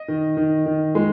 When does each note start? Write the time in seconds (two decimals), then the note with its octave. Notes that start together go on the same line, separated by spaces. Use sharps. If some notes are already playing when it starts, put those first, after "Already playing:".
Already playing: D#5
0.08 D#3
0.37 D#3
0.66 D#3
0.95 G#3